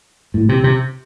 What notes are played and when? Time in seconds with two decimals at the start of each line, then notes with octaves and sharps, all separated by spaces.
0.34 A2
0.49 C3
0.64 C3